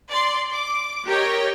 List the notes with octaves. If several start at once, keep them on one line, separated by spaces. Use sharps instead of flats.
D5 C6
D6
G4 A#4 C#5 D#5 G5